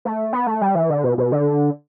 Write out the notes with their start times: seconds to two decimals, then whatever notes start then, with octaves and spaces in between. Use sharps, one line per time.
0.05 A3
0.33 B3
0.47 A3
0.61 G3
0.75 E3
0.90 D3
1.04 B2
1.18 B2
1.32 D3